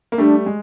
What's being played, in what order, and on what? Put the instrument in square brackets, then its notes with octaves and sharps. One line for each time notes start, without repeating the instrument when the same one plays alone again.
[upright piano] A#3
[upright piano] G3 A3 [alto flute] D4
[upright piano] G#3